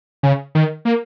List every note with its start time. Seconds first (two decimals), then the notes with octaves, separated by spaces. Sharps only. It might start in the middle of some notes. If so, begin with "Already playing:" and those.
0.23 C#3
0.55 D#3
0.85 A#3